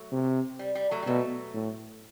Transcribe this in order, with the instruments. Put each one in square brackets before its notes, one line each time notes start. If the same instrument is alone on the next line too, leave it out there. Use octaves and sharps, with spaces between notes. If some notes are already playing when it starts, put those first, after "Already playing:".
Already playing: [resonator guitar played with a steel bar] F#3 A3
[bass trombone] C3
[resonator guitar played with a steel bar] G3
G3
F#3 A3
G3
[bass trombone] B2 [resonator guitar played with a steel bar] F#3 A3
[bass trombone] A2